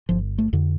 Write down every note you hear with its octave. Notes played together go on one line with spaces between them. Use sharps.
G1 F3
A3
F2 D3